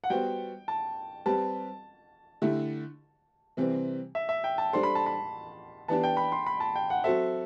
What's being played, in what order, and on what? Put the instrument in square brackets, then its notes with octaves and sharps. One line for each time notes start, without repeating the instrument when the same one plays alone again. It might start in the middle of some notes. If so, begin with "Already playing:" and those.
[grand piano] F#5
[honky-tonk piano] G3 B3 F#4 C5 [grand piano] G5
[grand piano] A5
[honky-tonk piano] G3 C4 G4 B4 [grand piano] A5
[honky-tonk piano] D3 A3 E4 G4
C3 E3 G3 C4
[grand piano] E5
E5
G5
A5
[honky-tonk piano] G3 D4 A4 C5 [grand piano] C6
[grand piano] B5
A5
B5
[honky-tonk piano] E3 B3 D4 G4 [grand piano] A5
[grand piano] G5
B5
C6
B5
A5
G5
F#5
[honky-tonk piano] F#3 C4 F#4 A4 C5 [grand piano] E5